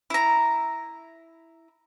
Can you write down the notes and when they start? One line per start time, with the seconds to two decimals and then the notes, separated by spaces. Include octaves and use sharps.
0.10 E4 A#5